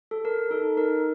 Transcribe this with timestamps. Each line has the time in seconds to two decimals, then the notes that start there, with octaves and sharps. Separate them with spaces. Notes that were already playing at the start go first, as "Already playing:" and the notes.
0.11 A4
0.25 A4 A#4
0.50 D#4 A4
0.77 D#4 A#4